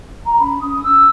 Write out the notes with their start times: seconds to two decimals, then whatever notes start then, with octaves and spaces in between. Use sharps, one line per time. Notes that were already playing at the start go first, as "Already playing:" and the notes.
0.25 A#5
0.37 C#4 B5
0.59 C#4 D#6
0.82 C#4 E6